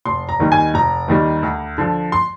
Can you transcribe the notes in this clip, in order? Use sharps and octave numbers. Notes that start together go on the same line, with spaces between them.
F1 C6
A#5
D#2 D#3 G3
G#5
F1 A#5
D#2 D#3 G3
D2
D3 F3
C6